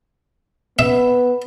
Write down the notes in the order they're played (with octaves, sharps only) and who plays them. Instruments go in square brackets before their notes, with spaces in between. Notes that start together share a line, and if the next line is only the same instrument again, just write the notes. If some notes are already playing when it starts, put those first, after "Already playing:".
[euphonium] B3 [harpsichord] E5